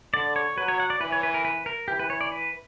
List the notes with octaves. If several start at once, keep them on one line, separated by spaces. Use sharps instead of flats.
D3 D5
C#5
F#3 B4
C#5
F#5
D5
E3 B4
C#5
B4
A#4
B4
A#4
E3 G4
B4
C#5
D5
B4